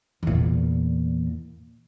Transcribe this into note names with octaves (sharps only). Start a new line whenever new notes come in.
E2 A#2